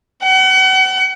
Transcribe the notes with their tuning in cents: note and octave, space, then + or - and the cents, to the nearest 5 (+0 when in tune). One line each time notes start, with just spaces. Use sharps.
F#5 +35